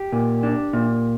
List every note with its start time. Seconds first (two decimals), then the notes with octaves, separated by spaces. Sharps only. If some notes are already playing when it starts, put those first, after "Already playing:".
Already playing: G4
0.13 A#2
0.43 D4
0.73 A#2